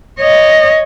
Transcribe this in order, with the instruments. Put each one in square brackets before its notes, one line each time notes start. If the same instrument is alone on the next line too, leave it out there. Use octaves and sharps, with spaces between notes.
[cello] C#5 D#5